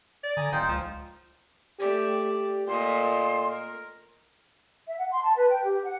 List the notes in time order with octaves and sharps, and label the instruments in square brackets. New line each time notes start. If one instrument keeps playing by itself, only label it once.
[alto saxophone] D5
[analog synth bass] D3 [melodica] G#5 A#5 D#6
[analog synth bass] D1 [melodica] D#4 F4 C5 [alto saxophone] G5
[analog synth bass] C#2 [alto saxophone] F3
[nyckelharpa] A3 D5 [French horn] G4
[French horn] G4
[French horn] A#2 [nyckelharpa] A4 D#5 [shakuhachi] C6
[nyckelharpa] A#4
[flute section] E5
F#5
C6
A5
B4
G5
G4
F#5